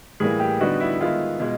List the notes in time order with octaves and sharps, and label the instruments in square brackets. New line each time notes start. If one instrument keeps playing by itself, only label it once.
[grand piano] A2 E3 G3 A#3 G#4
G4
D3 G3 B3 D#4 F#4
E4
D#3 G#3 B3 E4 F4
B2 G#3